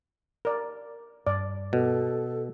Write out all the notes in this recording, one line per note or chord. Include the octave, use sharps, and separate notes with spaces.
A#4 D5
G2 D5
B2 A4